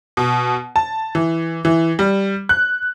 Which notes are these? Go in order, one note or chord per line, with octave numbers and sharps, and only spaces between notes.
B2
A5
E3
E3
G3
F#6